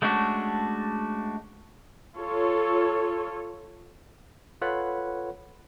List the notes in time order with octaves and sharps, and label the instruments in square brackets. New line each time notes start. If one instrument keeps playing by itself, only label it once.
[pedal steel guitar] G#3 A3 C#4 D4 F#4
[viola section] F4 A4 C#5
[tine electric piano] F4 A4 B4 C#5 F#5 B5